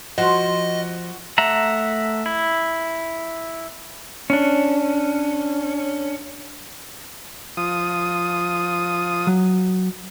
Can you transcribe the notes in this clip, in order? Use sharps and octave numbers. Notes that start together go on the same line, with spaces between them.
F3 F#4 D#5 F#5
A3 E5 F#5 A#5
E4
C#4 D4
F3 D#6
F#3